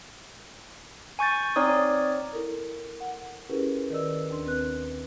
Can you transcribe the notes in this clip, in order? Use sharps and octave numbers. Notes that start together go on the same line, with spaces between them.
G#5 C#6 G6 A6
C4 D#4 C#5 D5 D#6
E4 A4 A#4
F#5
C#4 E4 G4 G#4 A#4 B4
D#3 A#4 B4 D5 D#5 E6
D#2 D4 C6
C4 B4 F#6